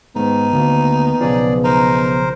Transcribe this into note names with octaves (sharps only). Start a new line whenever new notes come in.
G#2 D#3 B3 D#4
D2 A#3
B1 C#3 F3 G#4 D5
D#4 A#4 C5